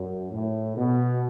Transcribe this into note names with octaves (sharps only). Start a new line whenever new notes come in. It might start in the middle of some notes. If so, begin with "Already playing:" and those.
Already playing: F#2
A2
B2